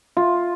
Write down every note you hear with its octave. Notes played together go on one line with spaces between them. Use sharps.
F4